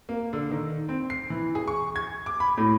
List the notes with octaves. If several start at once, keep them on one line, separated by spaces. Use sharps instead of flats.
A#3
D3
D#3
C4
C7
E3
G#4
C#6
G#6
D6
B5
A2